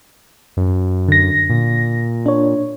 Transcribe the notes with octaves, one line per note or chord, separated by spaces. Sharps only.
F#2
D3 A#6
A#2
D4 C#5